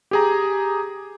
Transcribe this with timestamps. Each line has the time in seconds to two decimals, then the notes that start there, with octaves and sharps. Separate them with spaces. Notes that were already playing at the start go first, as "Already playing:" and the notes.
0.11 G4 G#4 A#5